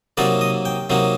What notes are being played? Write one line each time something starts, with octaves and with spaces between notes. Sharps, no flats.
C3 F#3 A#3 D#4 D5
D#5
G5
C3 F#3 A#3 D#4